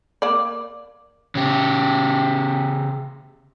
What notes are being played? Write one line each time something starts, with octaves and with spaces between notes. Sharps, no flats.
A#3 D5
C#3 G4